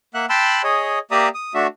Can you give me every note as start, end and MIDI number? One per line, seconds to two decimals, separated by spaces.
0.14 0.26 58
0.14 0.26 76
0.14 0.26 78
0.14 0.26 90
0.30 0.62 79
0.30 0.62 81
0.30 0.62 83
0.30 0.62 84
0.30 0.62 88
0.30 0.62 90
0.63 0.99 68
0.63 0.99 73
0.63 0.99 75
1.11 1.29 58
1.11 1.29 67
1.11 1.29 74
1.11 1.29 76
1.11 1.29 82
1.11 1.29 87
1.34 1.53 87
1.54 1.67 57
1.54 1.67 62
1.54 1.67 66
1.54 1.67 76